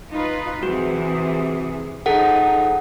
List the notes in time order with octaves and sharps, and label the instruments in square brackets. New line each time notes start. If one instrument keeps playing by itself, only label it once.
[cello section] D#4 F4 B4
[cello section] C3 E3 G#4 [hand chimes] F#4
[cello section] F3 D#4 [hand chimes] G#4 A4 F#5